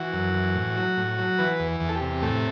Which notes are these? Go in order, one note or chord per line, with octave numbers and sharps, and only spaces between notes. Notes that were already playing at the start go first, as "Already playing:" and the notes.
Already playing: E3 F#4
F#2
E3
A2
F#3
A2
F#3
E3 B4
E2
E2
A4
G4
C3
A2 A3